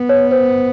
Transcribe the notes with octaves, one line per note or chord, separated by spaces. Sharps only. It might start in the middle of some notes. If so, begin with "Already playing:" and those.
Already playing: B3
C#5
C5